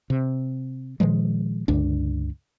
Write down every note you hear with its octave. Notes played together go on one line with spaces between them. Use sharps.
C3
A#2 D#3 F3 G#3
C#2 G2 D3 D4